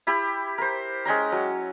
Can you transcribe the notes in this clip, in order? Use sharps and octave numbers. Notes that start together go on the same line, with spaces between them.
E4 G4 B5
A#4 C5
G#3 C#4 G5 A#5
F#3